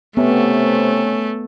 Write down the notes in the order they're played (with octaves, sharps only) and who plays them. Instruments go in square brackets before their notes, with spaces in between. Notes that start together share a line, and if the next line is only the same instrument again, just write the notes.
[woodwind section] C3 [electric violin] A3 [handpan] B3 [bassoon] C#4